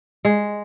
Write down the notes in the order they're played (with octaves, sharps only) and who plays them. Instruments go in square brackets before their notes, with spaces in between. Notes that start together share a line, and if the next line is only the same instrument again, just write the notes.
[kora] G#3